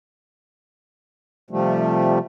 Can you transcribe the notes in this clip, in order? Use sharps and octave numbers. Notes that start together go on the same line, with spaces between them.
C3 F3 G3 A3